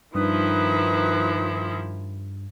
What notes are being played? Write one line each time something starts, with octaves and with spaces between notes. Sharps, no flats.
G2 D#3 F3 D#4 E4 B4 D#6